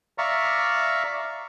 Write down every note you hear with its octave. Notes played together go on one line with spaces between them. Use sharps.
D5 E5 F5 A#5 C#6